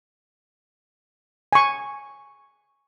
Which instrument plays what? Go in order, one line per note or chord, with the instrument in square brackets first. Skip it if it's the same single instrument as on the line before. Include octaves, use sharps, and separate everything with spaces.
[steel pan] G#5 C#6